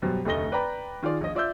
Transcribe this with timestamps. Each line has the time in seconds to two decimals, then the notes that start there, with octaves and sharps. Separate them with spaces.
0.02 F#2 B2 G3 C5
0.25 F1 D2 A3 D#5 A#6 G7
0.52 B4 D5 G5 A#5 B5
1.02 D#3 F4 G#4 D5
1.21 A#1 D#5
1.35 F4 D5 E5 E6 G6